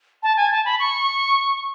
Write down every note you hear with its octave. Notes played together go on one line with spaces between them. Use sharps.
A5
G#5
A5
B5
C#6